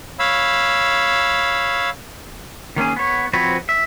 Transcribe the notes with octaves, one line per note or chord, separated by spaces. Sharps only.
C#5 F5 B5 E6
D#3 A#3 C#4 G#4
B3 C#5
F3 C4 F#4 B4 C#5
E5